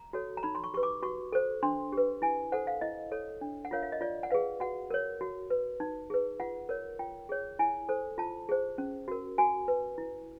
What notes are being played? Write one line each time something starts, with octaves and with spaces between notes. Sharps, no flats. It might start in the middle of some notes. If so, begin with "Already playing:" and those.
Already playing: A#5
F#4 A4 C#5
A#5
D#4 B5
C6
C#6
G4 B4 C#6
D6
F#4 C#6
A4 C5
D4 C6
G4 B4
E4 G#5
A4 C5 F#5
F5
E4 D#5
A4 C#5
D4
F#5
F4 A#4 C#5 F5
E5
D#5
F4 D5
F#5
G#4 B4 F5
F#4 F#5
A#4 C#5
F#4
B4
D#4
G#4 B4
F4 F#5
A#4 C#5
F4 G5
G#4 C#5
E4 G#5
A4 C5
F4 A5
G#4 C5
C#4
F#4 A#4
F#4 G#5
B4
E4